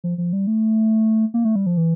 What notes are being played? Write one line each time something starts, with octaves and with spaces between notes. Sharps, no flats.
F3
F3
G3
A3
A#3
A3
G3
F3
E3